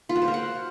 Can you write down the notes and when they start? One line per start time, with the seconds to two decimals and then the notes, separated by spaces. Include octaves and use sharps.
0.09 F4
0.16 F#4
0.22 C5
0.28 A#4
0.34 F#5